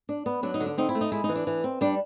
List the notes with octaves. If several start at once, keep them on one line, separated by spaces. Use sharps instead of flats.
D4
B3
F#3 D4
D#4
D3
D4
C4 D#4
E4
A3
D#4
G#3 E4
D#4
E3
D4
E3
C4
G3 D4